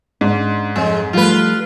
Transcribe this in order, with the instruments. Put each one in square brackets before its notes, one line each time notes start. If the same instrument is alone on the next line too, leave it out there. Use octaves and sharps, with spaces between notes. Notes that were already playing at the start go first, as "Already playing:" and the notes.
[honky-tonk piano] G#2 [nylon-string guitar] C#4 D4
[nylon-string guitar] F2 C#5 [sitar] G#3
[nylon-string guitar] F3 G3 A3 [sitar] F4 B4